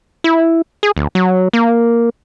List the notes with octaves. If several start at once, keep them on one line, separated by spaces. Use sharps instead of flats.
E4
G#4
D2
F#3
A#3